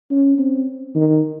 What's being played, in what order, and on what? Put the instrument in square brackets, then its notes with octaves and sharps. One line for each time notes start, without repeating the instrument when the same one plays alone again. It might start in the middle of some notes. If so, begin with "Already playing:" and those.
[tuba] C#4
C4
D#3